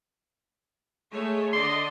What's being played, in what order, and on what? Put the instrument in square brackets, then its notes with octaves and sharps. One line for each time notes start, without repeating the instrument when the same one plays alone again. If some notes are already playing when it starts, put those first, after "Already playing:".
[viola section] G#3 A3 C#5
[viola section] D3 D5 D#5 [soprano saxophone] C6